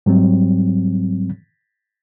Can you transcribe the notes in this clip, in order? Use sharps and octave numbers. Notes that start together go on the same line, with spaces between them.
G#2 F#3 G3 C4